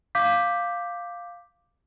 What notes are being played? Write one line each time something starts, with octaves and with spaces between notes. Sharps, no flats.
F5 D6 G6 B6